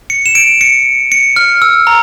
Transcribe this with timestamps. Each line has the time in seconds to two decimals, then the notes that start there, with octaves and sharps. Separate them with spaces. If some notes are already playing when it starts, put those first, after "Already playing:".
0.10 C#7
0.26 E7
0.35 D7
0.61 C#7
1.12 C#7
1.36 F6
1.62 E6
1.87 A#5